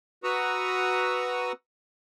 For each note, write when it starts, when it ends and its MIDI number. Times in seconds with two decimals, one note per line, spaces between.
0.24 1.52 66
0.24 1.52 71
0.24 1.52 82
0.24 1.52 85
0.24 1.52 87
0.24 1.52 88